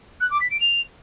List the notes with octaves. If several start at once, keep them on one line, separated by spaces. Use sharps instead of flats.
F#6
D6
B6
D7
F7